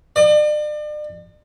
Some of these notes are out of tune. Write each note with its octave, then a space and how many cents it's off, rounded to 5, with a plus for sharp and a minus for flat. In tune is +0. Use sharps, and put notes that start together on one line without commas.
D5 +40